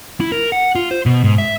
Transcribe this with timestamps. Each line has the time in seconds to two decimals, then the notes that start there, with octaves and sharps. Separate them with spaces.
0.20 E4
0.32 A#4
0.52 F#5
0.75 F4
0.91 C5
1.06 B2
1.24 G#2
1.38 E5